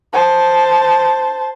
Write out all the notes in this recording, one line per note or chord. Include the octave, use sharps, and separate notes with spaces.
C5 A5